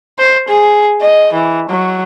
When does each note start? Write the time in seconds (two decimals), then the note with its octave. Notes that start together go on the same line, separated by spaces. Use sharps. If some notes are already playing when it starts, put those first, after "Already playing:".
0.18 C5
0.49 G#4
1.02 D#5
1.33 E3
1.69 F#3